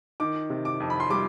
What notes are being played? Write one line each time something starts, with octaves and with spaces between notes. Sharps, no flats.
D#3 D6
C3
D6
F2
B5
C6
G3 D6